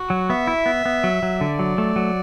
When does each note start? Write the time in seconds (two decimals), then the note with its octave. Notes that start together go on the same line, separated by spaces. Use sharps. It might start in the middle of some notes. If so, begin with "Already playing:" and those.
Already playing: F#4
0.10 F#3
0.30 B3 E5
0.47 E4
0.66 B3
0.85 B3
1.04 F#3
1.23 F#3
1.41 D3 D5
1.59 F#3
1.78 A3
1.96 F#3